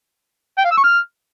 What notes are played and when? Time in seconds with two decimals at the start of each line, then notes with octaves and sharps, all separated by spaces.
0.58 G5
0.65 F5
0.71 E6
0.77 C#6
0.84 F6